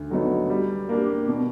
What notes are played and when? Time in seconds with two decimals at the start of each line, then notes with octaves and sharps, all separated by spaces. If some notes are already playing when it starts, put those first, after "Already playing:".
Already playing: D2
0.10 D3 F#3 B3 D#4
0.49 G3
0.89 A#3 D4 G4
1.28 B2